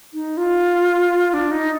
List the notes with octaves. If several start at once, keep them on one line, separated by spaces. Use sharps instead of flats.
D#4
F4
D4
D#4